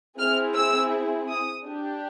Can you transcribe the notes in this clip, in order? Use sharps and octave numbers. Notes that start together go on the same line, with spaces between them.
C4 E4 G#4 F6
E6
D#6
D4 G4